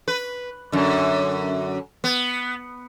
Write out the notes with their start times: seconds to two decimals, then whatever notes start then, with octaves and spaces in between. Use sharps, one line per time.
0.08 B4
0.72 F#2 D3
2.04 B3